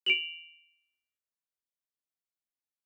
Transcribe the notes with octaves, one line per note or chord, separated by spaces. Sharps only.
D7 F7 F#7